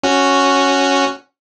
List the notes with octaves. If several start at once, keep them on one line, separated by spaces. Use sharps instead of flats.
C#4 F#4